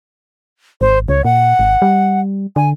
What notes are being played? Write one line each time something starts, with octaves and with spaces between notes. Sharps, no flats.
G#1 C5
C#2 C#5
A#2 F#5
G#1
G3
D3 G#5